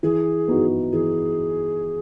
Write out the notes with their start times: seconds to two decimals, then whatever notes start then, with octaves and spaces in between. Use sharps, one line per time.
0.03 E3 G#4
0.48 B3 D#4 F#4
0.93 E3 G#4